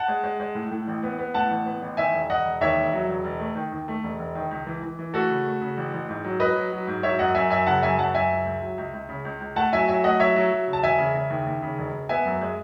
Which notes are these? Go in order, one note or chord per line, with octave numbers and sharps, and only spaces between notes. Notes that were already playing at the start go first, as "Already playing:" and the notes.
Already playing: F#5 A5
G#3
G#3
G#3
A2
A2
A1
B3
B3
A2 F#5 A5
A1
B3
A1
D#3 E5 G#5
E1
E1 D#5 F#5
E1
D#2 C#5 E5
E1
F#3
E1
E1
A3
D#3
D#2
A3
E1
E1
D#3
C#2
E3
E3
E3
A3 F#4 A4
C#3
A3
C#3
A1
A1
G#2
F#3
F#3 B4 D#5
F#3
F#3
G#2
F#3 C#5 E5
F#2 D#5 F#5
F#2 E5 G#5
F#2 E5 G#5
C#3 F#5 A5
F#2 E5 G#5
F#2 F#5 A5
F#2 E5 G#5
C#2
C#2
F#3
C#2
C#2
C#3
C#2
C#2
A3 F#5 A5
F#3 E5 G#5
F#3 E5 G#5
A3 D#5 F#5
F#3 C#5 E5
F#3
F#3
C#3
A5
E1 E5 G#5
C#3
C#3
D#2
D#2
C#3
E1
E1
B3 E5 G#5
F#2
G#3